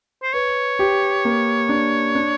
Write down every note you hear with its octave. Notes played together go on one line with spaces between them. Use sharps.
C5
B4 C#5
G4
A#3
D4
D4